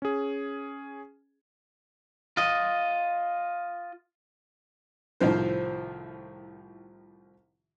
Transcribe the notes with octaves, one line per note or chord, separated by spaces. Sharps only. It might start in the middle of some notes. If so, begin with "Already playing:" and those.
C#4 G#4
F4 D#5
C2 A2 D#3 F3 C5